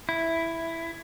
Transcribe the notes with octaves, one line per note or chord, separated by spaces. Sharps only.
E4